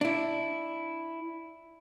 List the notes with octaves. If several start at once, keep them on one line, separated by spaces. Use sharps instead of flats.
D4 E4